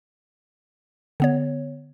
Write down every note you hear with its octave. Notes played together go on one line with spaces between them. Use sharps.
D3 B3 C#5